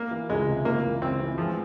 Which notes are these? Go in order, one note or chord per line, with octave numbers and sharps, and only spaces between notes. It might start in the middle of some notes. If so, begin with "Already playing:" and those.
Already playing: A#3
E3
C#2 G#3
C3
C#2 A#3
E3
C#2 C4
E3
F3 G#3